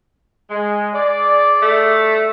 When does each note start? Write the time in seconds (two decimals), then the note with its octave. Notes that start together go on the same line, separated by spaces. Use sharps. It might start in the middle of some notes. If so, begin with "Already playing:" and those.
0.50 G#3
0.94 G#4 D5
1.62 A3